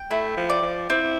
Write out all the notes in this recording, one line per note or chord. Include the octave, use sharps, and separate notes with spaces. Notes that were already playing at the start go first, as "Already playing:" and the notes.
Already playing: G5
A3 E4
F3
D5
F3
C4 E4